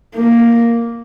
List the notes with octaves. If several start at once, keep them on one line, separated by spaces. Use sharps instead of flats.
A#3